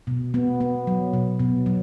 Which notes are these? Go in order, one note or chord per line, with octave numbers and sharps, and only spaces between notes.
B2
B3
B3
F#3
B2
B2
F#3